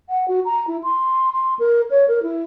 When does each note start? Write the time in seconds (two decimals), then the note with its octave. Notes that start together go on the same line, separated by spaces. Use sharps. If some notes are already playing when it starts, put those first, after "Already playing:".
0.09 F#5
0.28 F#4
0.45 A#5
0.67 E4
0.84 C6
1.32 C6
1.59 A#4
1.91 C#5
2.08 A#4
2.23 E4